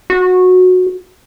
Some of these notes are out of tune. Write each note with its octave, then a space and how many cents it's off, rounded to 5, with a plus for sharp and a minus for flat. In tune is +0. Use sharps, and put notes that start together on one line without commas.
F#4 -15